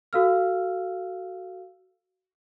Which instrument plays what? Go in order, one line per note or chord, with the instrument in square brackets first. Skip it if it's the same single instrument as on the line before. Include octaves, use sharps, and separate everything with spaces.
[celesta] F#4 A4 F5 E6 F6